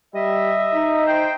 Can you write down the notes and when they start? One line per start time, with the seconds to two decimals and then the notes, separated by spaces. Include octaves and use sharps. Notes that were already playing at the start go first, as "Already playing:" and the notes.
0.14 G3 D#5 E5
0.74 D#4
1.06 C5 G5